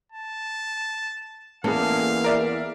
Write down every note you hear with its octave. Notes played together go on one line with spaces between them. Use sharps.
A5
E2 A#3 B3 C#4 G#4 A4 F5
A#4 D5 E5